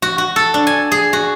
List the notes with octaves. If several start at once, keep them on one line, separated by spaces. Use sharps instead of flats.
F#4
F#4
A4
D4
G#5
G#4
F#4